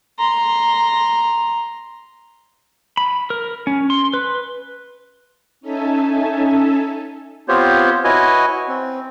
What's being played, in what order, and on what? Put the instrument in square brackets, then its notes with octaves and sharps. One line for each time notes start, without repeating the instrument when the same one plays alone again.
[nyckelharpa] A#5 C6
[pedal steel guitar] B5
A#4
C#4
C6
B4
[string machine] C#4 D#4 A4 E5 G#5 A5
[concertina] B3 C4 F4 G4 C5 C#5
E4 F#4 B4 C#5 D#5 G#5
C4